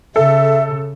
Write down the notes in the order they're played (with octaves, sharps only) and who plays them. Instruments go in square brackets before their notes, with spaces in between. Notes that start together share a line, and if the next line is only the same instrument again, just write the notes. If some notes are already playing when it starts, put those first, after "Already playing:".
[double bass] C#3 [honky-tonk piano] A4 [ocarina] E5